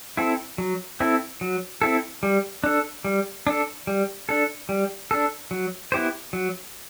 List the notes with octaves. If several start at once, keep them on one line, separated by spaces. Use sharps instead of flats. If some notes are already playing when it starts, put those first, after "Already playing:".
C4 E4 A4
F#3
C4 E4 A4
F#3
C4 E4 A4
G3
D4 A4
G3
D4 A4
G3
D4 A4
G3
D4 A4
F#3
B3 E4 G4 C5
F#3